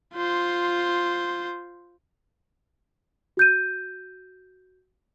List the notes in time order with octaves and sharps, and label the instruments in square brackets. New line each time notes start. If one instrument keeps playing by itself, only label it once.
[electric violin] F4 C5
[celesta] F#4 G6 D#7